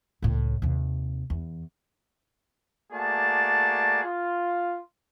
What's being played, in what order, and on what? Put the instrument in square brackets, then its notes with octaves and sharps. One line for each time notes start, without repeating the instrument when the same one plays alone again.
[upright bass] C#2 A2
D#2 C3
E2
[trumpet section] A3 A#3 F#4 G#4 D5 A5
F4